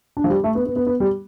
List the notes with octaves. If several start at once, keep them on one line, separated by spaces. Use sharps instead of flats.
D4
F3
G3
A3
B3
B3
B3
B3
G3